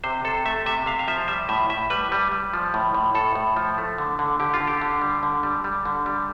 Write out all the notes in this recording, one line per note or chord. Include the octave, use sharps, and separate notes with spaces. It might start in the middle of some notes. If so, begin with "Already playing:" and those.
C3 C5
C3 A4
A3 E5
C3 E5
C3 F5
F5
F3 E5
G3 E5
A2 E5
A2 E5
G3 B4
G3
G3
F3
A2
A2
A2 A4
A2
F3
A3
D3
D3
D3 G4
F4
D3
G4
D3
G3
D3
G3
G3
D3
G3